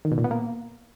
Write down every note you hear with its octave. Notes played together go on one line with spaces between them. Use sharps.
D#3
B2
A#2
B3
A#3